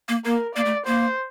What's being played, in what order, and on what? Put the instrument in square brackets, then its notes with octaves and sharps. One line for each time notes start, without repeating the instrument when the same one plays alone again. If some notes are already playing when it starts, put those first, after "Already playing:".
[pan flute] A#3
[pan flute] A#3 [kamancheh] A#4
[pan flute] A#3 [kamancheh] D5
[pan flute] A3
[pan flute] A#3 [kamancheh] C5